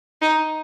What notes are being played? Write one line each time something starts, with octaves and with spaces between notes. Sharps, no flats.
D#4